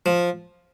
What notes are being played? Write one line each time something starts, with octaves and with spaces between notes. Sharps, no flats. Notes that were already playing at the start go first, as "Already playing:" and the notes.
F3